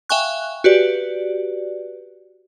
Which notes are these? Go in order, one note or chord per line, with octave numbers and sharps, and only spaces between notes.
E5 F5 G5 G#5 C#6 F#6
F#4 G4 B4 D5